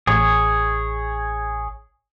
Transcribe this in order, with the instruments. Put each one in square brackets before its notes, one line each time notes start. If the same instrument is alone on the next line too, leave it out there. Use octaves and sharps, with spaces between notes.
[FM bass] A1 [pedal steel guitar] G#4 C#5